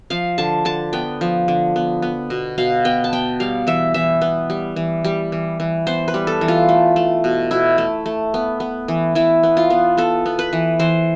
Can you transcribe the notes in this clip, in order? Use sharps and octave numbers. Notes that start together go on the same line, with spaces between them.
F3 F5
D3 A5
D3 A5
B3 G5
F3
D3
B3
B3
B2
B2 F5
B3 G5
A5
B3 G5
G3 F5
E3 E5
E3 E5
B3
G3
E3
G3
E3
E3
B3 C5
B4
G3
A4
E3
F4
A3
A3
B2
B2 E4
A3
A3
B3
B3
E3
E3 E4
B3
F4
B3
B3 A4
B3
B4
E3
E3 C5